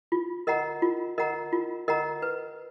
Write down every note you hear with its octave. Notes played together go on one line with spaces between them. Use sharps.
F4
A#4 D#5 F#5 A#5
F4
A#4 D#5 F#5 A#5
F4
A#4 D#5 F#5 A#5
B4